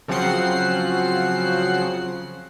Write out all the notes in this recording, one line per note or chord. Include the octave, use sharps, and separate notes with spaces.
C#3 F3 F#3 C4 F#5 C7